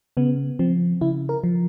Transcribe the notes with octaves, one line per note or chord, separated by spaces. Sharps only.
C#3 B3
F3 C4
C#3 E4
A#4
F3